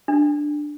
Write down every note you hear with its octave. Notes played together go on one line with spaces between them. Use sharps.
D4